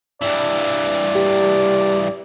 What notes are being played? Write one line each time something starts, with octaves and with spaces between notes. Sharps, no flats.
G2 E3 D5
G4